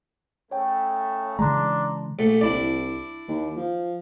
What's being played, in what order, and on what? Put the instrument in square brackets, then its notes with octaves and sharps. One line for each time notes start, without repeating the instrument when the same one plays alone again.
[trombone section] C#3 A3 [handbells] C#5 G5
[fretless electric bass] C#3 E3 G#3 [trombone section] D4 [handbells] A#5 C6
[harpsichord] A#1 A3
[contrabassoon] C2 [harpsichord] D4 E4 D5
[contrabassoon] D#2
F3